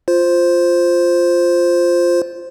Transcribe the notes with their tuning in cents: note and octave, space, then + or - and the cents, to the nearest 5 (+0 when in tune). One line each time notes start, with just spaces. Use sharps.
F4 +0 C5 +0